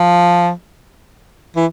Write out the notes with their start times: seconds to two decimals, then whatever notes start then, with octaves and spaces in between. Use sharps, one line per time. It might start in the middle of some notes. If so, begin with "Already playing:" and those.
Already playing: F3
1.56 E3